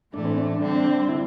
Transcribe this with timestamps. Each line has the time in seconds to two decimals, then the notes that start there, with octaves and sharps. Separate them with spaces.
0.12 A2 E3 A3 D4
0.25 C4
0.38 D4
0.60 D3 G3 C4
1.09 E4